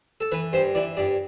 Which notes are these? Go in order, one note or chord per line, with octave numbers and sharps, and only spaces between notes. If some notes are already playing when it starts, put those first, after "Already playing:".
A4
E3 B4
G2 C5
E3 D5
G2 D5